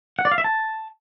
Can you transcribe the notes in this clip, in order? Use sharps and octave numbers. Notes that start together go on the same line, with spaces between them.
F#5
D5
F5
E5
A5